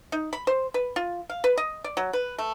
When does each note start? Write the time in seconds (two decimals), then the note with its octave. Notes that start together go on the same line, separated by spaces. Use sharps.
0.12 D#4
0.33 B5
0.47 C5
0.74 B4
0.96 F4
1.29 F5
1.44 B4
1.57 D#5
1.84 D5
1.97 F#3
2.13 B4
2.38 A3